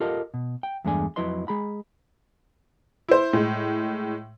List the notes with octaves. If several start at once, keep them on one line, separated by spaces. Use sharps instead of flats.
F4 G4 A4 A#4 D#5
B2
G5
E2 G2 G#3 A3 D4 G#5
F2 F#3 E4 B4 D#5 C6
G#3 G#4 A#5 B5
E4 C5
A2 G#3